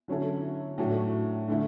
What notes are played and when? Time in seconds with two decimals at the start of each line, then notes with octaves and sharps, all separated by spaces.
0.08 D3 F#3 C#4 E4 A4
0.78 A2 F#3 A3 D4 F#4
1.48 D3 A3 E4